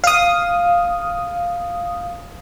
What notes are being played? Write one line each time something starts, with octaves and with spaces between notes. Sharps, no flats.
F5 D#6